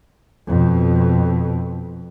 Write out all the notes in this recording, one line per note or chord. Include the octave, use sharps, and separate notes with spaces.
F2 B2